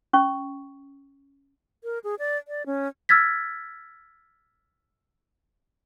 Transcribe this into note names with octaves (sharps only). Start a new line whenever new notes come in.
C#4 C#6
A#4
G#4
D5
D5
C#4
E6 F6 G#6 A6 B6